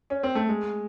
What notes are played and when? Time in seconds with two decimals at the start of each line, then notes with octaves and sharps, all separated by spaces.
0.10 C#4
0.23 C4
0.35 A3
0.49 G#3